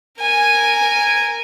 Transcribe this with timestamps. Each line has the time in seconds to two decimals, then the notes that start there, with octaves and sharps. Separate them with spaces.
0.20 A#4 G#5